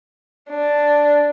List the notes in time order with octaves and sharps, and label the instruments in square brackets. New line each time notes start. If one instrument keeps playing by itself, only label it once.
[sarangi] D4